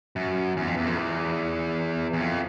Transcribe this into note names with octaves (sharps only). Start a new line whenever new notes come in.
F#2
E2
F2
E2
F2
E2
E2
F2